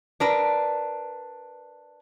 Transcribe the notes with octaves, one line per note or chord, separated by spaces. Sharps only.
D4 A#4 B4